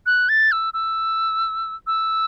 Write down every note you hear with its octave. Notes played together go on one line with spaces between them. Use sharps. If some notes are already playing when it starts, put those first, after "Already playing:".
F#6
A6
E6
E6
E6